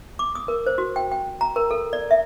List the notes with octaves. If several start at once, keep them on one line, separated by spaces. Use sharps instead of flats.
D6
D#6
A#4
C5
F#4
G5
G5
A#5
A#4
A4
D5
E5